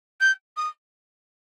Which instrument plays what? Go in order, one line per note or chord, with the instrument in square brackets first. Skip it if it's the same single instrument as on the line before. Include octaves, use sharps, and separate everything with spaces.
[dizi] G6
D#6